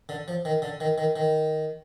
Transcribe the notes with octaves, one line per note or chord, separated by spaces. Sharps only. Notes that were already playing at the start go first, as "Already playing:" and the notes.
D3
F3
D#3
D3
D#3
D#3
D#3